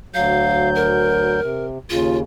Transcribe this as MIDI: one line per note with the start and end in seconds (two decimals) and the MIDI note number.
0.14 1.40 38
0.14 1.40 54
0.14 0.69 77
0.14 1.40 91
0.75 1.66 70
1.42 1.78 48
1.90 2.23 39
1.90 2.23 49
1.90 2.17 65